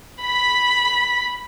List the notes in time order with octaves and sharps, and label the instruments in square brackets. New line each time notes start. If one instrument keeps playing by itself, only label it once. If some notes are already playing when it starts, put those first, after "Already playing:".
[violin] B5 B6